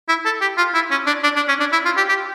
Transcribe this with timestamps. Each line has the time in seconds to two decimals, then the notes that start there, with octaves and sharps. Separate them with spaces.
0.08 E4
0.25 A4
0.41 G4
0.57 F4
0.74 E4
0.91 C#4
1.06 D4
1.23 D4
1.36 D4
1.48 C#4
1.60 D4
1.72 E4
1.85 F4
1.97 G4
2.09 G4